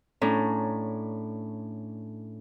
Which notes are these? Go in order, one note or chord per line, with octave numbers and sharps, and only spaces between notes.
A2 C#4 D4 A#5